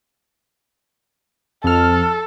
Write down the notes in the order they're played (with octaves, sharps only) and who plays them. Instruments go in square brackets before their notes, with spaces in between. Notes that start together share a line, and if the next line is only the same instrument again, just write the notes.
[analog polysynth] F2 F6 [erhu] A4